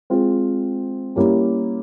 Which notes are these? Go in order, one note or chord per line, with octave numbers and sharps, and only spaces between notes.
G#3 C4 F4
G3 A#3 C#4 E4 G4